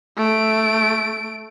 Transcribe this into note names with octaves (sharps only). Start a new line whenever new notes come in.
A3 D7